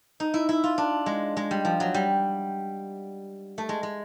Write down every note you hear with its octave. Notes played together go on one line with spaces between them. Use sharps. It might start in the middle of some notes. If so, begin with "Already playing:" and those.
D#4
E4
E4
F4
D4
G#3
G#3
G3
F3
F#3
G3
A3
G#3
G#3